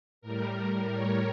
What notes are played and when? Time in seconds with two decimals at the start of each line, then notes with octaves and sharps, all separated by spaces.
0.21 A2 G3 A#4
0.92 C#5